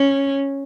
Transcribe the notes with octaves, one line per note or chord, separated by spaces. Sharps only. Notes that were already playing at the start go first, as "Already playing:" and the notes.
Already playing: C#4